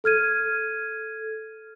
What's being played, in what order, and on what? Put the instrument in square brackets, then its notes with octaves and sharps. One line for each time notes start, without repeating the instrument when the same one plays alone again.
[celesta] A4 F6 G#6 D#7